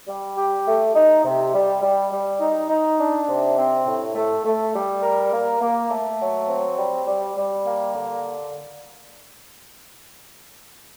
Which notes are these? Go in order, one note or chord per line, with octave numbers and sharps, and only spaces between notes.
G3
G4
A3
D#4
C3
G3
G3
G3
D#4
D#4
D4
C3
C4
A2
A3
A3
G3
A#4
A#3
A#3
A3
F#3
C4
G3
G3
G3
A#3
D3